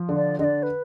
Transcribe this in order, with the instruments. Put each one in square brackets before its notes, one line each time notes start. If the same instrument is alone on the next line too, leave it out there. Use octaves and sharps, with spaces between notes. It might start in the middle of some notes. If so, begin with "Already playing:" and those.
Already playing: [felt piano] F3
D3
[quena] D5
[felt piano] D3 [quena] D#5
[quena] D5
B4